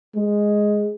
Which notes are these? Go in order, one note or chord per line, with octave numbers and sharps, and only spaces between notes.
G#3